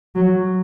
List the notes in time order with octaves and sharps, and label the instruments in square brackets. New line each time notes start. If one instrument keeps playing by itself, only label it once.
[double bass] F#3